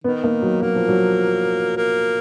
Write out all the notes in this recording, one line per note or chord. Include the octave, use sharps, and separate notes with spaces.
D#3 B3
A#3
F#3
F#3 A#3
F3
F#3
A#3